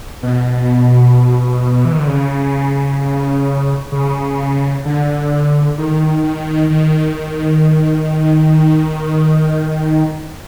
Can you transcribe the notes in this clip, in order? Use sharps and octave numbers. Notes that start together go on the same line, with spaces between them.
B2
E3
D#3
D3
C#3
C#3
D3
D#3
D#3
D#3